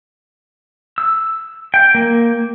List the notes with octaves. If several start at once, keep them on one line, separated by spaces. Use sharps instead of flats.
E6
G5
A#3